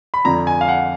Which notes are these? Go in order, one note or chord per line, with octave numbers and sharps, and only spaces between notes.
B5
F2 D3 F3 A#5
G#5
F5
F#5